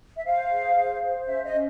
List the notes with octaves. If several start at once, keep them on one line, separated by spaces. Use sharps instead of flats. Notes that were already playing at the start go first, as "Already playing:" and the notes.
E5
C5 F5
G#4
C5
C5
C#4 E5
D#5
C#4